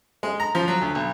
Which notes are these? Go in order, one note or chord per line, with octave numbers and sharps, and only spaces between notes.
G#3
A#5
F3
F#3
D2
B1